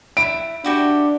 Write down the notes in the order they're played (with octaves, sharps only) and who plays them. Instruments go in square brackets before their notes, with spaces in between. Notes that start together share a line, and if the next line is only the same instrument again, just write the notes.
[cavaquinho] E4 [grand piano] D7
[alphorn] D4 [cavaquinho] E4 F#4 G4